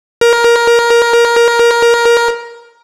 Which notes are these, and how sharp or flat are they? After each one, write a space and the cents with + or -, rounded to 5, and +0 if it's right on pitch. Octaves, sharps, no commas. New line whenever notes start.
A#4 +15